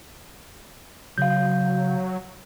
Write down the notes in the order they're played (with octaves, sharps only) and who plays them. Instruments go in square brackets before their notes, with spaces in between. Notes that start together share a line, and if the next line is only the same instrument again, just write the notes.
[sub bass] C#3 [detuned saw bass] F#3 [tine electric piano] F5 G6